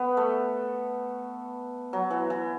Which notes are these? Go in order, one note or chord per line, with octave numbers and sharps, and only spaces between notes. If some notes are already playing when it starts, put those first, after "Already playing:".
Already playing: B3
A3
F#3
E3
E3